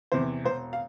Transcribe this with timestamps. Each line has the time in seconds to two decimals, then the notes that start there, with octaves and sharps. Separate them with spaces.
0.12 E2 C3 E3 C5
0.44 E1 C5
0.73 F5